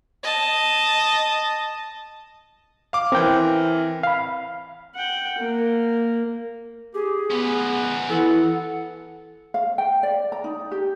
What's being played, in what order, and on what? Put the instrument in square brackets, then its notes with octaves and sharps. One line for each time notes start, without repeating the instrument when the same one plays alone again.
[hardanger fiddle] D#5 A5
[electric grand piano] F5 D6
[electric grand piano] E3 A#4 [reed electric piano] C4 G5
[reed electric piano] F5 B5
[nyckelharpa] F#5 G5
A#3
[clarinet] G4 [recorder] G#4
[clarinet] B3 [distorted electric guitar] C#4 B4
[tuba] E3 [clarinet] A4 [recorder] F#5
[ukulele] F5
G5
D5
A#5
D#4
G4